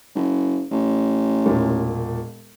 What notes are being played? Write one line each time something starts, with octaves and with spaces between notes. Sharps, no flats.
F#1
A1
E1 A#2